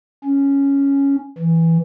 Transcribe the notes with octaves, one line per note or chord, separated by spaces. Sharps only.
C#4
E3